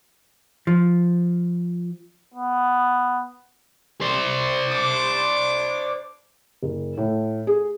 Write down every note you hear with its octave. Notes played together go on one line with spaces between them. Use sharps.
F3
B3
C5 D5
D4 D6
F#1
A2
G#4